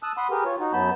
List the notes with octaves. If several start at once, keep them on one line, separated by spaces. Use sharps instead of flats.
A5 D#6 E6 F#6
F#5 B5 C6 D#6
G4 G#4 A#4 B4
F4 C#5
D#4 F#4
F#2 F#3 B3 A5 B5 G6